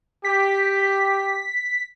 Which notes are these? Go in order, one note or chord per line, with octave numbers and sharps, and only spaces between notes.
G4 B6